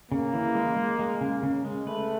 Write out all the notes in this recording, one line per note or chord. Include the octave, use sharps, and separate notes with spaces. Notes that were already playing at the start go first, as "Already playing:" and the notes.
C#3 A#3
E3
G#3
G#3
G#3
C#3
C#3
G#3
A3 B4